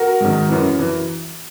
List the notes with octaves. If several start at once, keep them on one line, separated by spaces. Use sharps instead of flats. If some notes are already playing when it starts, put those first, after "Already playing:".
Already playing: F#4 A#4
G#2 D#3
F#2 E3
E3